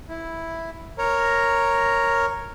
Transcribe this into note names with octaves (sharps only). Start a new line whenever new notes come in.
E4
A#4 C#5 A#5